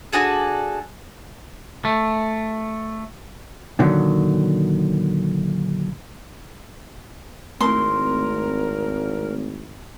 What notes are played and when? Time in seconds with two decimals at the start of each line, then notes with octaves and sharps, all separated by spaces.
0.13 D4 F#4 G#4 A4
1.85 A3
3.79 A#2 D3 D#3 F#3
7.61 G#1 A3 C4 E4 A#4 C6